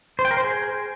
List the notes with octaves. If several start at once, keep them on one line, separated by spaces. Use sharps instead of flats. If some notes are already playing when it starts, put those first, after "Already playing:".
C5
G5
A#4
C5
G#4